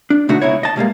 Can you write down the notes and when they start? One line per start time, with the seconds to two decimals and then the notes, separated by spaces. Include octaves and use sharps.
0.10 D4
0.29 B2 D3 A3 D#4 F#4
0.42 C#2 B2 D#4 E4 C#5
0.63 D#5 A5
0.76 B2 G3 G#3 A#3